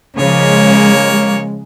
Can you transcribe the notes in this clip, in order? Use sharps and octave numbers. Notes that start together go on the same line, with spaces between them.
C#3 F3 G#3 A#3 C#5